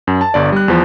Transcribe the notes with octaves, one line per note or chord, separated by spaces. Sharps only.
F#2
A5
G1 G2 D5
G3 F#6
E2 F3